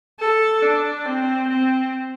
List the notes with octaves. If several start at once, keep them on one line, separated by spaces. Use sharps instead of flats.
A4
D4
C4
C4